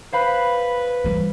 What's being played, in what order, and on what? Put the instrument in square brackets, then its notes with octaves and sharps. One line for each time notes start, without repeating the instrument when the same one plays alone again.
[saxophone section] B4 [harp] C5 F5 B5
[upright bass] E3 G3